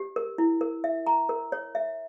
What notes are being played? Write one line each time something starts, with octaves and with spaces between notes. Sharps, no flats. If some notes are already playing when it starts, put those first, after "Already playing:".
Already playing: G4
A#4
E4
A#4
E5
A#5
A#4
C#5
E5